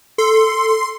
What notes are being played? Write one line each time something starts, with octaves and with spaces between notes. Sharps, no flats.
A4 C6